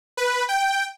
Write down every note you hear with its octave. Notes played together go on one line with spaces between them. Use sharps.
B4
G5